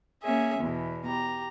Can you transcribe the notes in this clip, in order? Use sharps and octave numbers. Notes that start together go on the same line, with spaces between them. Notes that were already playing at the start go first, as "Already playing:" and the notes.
A#3 C#4 G#4 E5
E2 B2
G4 A#5